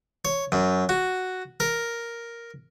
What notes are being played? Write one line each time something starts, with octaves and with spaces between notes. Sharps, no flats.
C#5
F#2
F#4
A#4